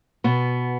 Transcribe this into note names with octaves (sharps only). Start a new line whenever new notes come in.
B2 B3